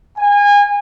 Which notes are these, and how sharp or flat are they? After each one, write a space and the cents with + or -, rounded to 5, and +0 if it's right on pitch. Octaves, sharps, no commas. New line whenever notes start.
G#5 -30